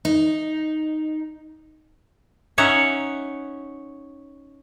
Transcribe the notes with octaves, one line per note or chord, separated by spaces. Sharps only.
D#4
C#4 D#4 C#5 E5 F#5